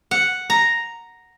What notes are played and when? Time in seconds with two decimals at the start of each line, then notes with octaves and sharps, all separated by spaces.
0.11 F#5
0.50 A#5